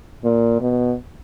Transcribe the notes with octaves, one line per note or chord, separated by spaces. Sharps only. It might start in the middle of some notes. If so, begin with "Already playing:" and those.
A#2
B2